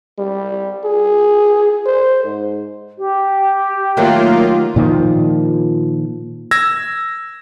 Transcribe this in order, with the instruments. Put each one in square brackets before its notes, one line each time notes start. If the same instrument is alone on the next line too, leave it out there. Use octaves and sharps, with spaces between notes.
[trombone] G3
G#4
C5
G#2
[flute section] G4
[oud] D#3 F#3 A3 [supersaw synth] A#3 F4
[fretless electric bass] A#2 D#3 F3
[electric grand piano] E6 G#6 A#6